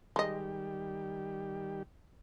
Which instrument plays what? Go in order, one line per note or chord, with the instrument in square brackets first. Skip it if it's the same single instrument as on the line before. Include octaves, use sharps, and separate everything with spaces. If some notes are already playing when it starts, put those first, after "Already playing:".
[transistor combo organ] D#3 G3 G4 [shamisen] G#3 D#5